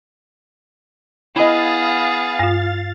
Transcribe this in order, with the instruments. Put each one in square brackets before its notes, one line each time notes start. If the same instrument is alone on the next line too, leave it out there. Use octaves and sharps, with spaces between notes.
[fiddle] B3 G#4 [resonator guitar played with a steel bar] E4 D#5 [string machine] F5 A6
[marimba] G2 F4